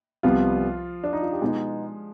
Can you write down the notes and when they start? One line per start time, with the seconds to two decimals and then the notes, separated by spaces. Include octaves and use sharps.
0.23 C2 C3 F3 G3 B3 F4
1.04 D4
1.13 D#4
1.22 F4
1.32 G4
1.41 B2 G#3 B3 D#4 G#4